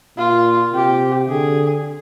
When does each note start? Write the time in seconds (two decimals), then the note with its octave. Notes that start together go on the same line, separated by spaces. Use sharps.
0.18 A#2 F4
0.74 C3 G4
1.29 D3 G#4